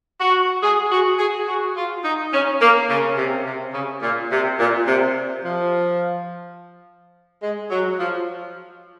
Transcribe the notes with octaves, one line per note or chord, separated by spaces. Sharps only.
F#4
G#4
F#4
G#4
F#4
F4
D#4
C#4
A#3
C#3
C3
C3
C#3
A#2
C3
A#2
C3
F3
G#3
F#3
F3